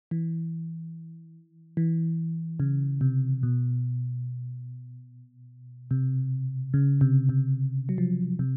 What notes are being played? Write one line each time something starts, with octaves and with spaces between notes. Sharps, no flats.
E3
E3
C#3
C3
B2
C3
C#3
C3
C3
F#3
F3
C3